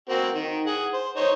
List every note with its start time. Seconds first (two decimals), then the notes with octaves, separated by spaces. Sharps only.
0.09 A#3 C4 F#4
0.34 D#3
0.66 G#4 F#5
0.93 C5
1.17 D#4 C5 C#5